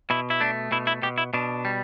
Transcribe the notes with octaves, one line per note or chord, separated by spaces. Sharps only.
B2 E4
E4
A3 D4
B2 E4
E4
B2 G4
E4
B2 D4
G3